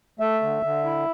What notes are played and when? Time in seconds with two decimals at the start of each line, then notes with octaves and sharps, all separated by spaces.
0.20 A3 E5
0.42 D3
0.63 D3
0.85 E4